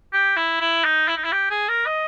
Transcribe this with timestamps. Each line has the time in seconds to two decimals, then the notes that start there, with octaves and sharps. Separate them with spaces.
0.13 G4
0.37 E4
0.61 E4
0.85 D#4
1.08 E4
1.17 D#4
1.24 E4
1.32 G4
1.51 G#4
1.69 A#4
1.86 D#5